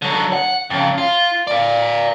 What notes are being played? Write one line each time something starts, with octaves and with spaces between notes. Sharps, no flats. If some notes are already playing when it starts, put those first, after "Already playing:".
D3 F#3
F#5
F2 C#3
F4
D5 F5